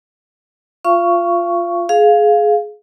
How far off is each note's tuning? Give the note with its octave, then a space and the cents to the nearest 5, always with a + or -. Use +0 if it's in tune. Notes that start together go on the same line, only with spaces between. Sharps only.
F4 +0 F5 -35 C#6 +5
G#4 +20 F5 +0